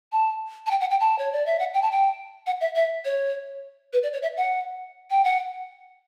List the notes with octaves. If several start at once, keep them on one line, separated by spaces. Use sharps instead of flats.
A5
A5
G5
F#5
G5
A5
C#5
D5
E5
F#5
G5
A5
G5
F#5
E5
E5
C#5
B4
D5
C#5
E5
F#5
G5
F#5